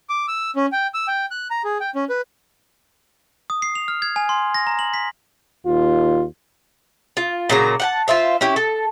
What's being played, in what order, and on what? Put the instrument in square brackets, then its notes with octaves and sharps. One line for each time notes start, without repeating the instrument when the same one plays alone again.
[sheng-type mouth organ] D6
E6
C#4
G5
E6
G5
F#6
A#5
G#4
G5
C#4
B4
[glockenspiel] D#6
C7
F7
F6
G#6
G#5
C6
A#6
A#5
F#7
B6
[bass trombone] D#2 [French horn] F4
[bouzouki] F4
A#2 C#3 F#3 A#5
F#5 G5 A5
F4 C5 E5 F5
C#4 E4 G4
A4